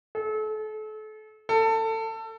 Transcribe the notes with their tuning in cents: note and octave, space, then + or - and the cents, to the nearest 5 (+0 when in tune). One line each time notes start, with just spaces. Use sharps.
A4 -35
A4 +25